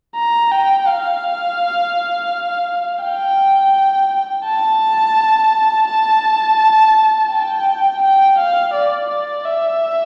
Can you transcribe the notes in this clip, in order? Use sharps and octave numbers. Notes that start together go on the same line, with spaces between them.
A#5
G5
F5
G5
A5
A5
G5
G5
F5
D5
D5
E5